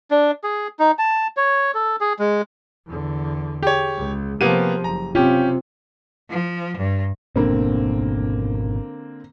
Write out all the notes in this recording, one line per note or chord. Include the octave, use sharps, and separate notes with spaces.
D4
G#4
D#4
A5
C#5
A4
G#4
G#3
E2 D3
G4 G#4 C#5
C#2
C3 F3 A#3 B3 G4 D#7
F#1 A#5
C3 C4 C#4 F4 G4
F3
G2
G#1 B2 D3 A#3 C4